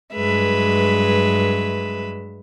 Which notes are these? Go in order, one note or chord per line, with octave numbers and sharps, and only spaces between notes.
G2 F#3 G#3 B4 E5